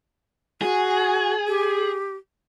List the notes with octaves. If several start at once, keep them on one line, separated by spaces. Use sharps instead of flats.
F#4 G#4
G4